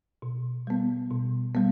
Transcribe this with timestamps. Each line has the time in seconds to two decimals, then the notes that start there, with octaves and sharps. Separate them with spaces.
0.22 B2
0.67 G3 B3
1.11 B2
1.55 G3 B3